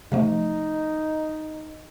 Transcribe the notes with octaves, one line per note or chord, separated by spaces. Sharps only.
C3 F3 A3 D#4